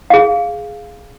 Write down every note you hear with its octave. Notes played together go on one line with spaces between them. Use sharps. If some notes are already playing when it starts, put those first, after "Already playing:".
G#4 F5